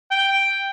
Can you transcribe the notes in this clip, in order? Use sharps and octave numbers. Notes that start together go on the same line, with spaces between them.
G5